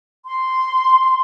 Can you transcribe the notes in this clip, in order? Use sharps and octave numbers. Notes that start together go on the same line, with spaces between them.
C6